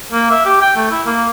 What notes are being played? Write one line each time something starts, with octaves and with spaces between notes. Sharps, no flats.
A#3
E5
G4
G5
A3
E4
A#3